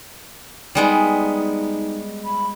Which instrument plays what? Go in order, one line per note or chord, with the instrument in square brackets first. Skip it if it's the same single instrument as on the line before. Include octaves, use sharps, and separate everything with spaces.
[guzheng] G3 G#3 B3 [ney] D#4
[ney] B5